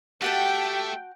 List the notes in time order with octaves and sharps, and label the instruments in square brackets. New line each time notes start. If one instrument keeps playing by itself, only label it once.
[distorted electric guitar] A3 [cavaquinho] F#4 F#5 A5 [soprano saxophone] G4 [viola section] G5